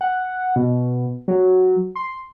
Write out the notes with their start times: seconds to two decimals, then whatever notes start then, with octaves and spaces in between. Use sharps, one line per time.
0.01 F#5
0.56 B2
1.28 F#3
1.96 C6